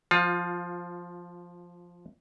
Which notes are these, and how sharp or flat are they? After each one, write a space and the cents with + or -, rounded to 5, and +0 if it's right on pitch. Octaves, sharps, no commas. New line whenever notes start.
F3 +0 F4 +25